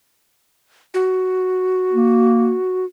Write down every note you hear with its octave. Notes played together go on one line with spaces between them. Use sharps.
F#4
A#3